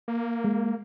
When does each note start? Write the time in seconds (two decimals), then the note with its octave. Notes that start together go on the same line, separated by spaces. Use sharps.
0.08 A#3
0.44 G#3